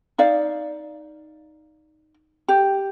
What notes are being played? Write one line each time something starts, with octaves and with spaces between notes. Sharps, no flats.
D#4 D5 F5
G4